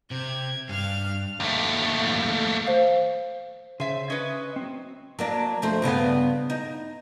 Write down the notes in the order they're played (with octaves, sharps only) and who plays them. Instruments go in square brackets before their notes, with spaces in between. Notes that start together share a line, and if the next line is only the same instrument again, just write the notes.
[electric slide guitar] C3 [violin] G#6
[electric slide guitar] G2 [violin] F5 F6
[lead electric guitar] D#2 A3
[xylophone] C5 F5
[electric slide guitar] C#3 C5 [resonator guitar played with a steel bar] E5 G#5
[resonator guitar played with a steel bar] C#4 B4 [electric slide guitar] D#5
[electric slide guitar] F#3 C4
[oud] F#3 A#3 D4
F2 A3 C5
G2 C#3 B3
D#4